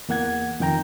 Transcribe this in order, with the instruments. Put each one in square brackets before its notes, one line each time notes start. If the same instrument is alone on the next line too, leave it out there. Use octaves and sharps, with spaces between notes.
[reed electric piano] E2 A#3 F#5 G#6
F2 D#3 G5 A#5